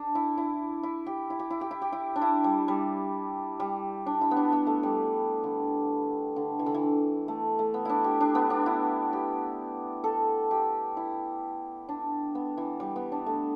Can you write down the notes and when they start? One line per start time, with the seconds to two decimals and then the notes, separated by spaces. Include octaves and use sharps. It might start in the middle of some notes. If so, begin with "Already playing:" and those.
Already playing: D4
0.15 E4
0.38 E4
0.83 E4
1.07 G4
1.30 E4
1.39 G4
1.50 E4
1.61 G4
1.71 E4
1.82 G4
1.93 E4
2.16 D4
2.21 E4
2.44 G3
2.68 G3
3.60 G3
4.06 D4
4.21 E4
4.31 B3
4.37 D4
4.52 B3
4.67 A3
4.83 G3
5.44 D3
6.36 D3
6.59 E3
6.66 D3
6.74 E3
7.28 A3
7.59 A3
7.74 B3
7.85 D4 E4
8.04 G4
8.21 D4
8.35 B3
8.50 D4
8.66 E4
9.13 G4
10.04 A4
10.51 G4
10.97 E4
11.89 D4
12.35 B3
12.58 E3
12.80 G3
12.96 B3
13.12 D4
13.27 A3